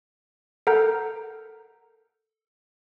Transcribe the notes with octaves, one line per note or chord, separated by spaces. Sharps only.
A4 A#4 F#5 A#5 G6